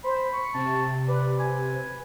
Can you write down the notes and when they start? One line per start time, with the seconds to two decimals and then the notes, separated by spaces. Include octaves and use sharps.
0.04 C5 B5
0.33 C#6
0.54 C3 A5
1.08 B4 D5
1.39 G#5